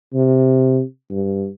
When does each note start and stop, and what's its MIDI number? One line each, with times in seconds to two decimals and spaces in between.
0.14 0.81 48
1.11 1.48 43